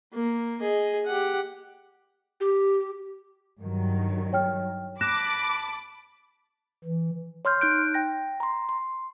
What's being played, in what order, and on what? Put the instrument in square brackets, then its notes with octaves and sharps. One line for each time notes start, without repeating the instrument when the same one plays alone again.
[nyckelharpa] A#3
G#4 D#5
G4 F#5
[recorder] G4
[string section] G2 D#3 F#3
[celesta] C#5 G5 F6
[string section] A5 B5 D6 [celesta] F#6 A#6 E7
[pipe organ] E3
[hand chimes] C#5 C6 F6 G6
D#4 F#6 G6 D7
G5 A#6
A#5 C6
C6